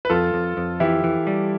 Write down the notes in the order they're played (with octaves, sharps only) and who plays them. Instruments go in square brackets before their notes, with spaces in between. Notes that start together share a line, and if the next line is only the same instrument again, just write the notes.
[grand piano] B4
[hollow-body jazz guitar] F2 [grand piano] F4 A4
[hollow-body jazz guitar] F2
F2
[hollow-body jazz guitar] E3 [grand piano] E4 G4
[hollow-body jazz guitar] E3
G3